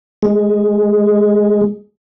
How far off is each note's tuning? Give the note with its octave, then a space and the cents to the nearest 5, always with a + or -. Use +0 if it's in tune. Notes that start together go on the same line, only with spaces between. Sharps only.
G#3 +10